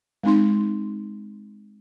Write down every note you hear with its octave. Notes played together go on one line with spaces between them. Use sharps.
G#3 C4 D#4 C6